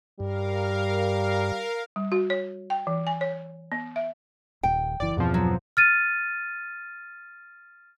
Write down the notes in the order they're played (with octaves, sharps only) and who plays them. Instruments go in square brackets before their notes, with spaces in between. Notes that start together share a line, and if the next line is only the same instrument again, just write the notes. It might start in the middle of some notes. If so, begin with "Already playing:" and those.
[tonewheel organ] G2 [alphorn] G3 [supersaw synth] A#4 F5
[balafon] G3
F#4
C#5
G5
E3
G#5
C#5
B3
E5
[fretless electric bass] D#1 [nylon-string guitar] G5
[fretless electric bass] F#1 E3 [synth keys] D5
[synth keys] E2 F3 [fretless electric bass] G2 B2 C4
[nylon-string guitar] F#3
[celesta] F6 A6 D#7